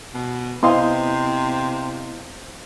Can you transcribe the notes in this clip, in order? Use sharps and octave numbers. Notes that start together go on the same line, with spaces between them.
B2
C3 B3 E4 C5 D#5 F5 C6